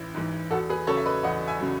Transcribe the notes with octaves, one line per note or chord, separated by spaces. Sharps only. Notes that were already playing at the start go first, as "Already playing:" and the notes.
Already playing: A1 E3 E4
G#2 E3
E2 F#4 A4
G#4 B4
C#3 F#3 A4 C#5
E5
B4 D#5
E2 D#5 F#5
E5 G#5
C#3 F#3